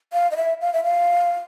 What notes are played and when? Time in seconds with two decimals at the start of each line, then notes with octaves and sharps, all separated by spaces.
0.13 F5
0.31 D#5
0.37 E5
0.61 F5
0.73 E5
0.84 F5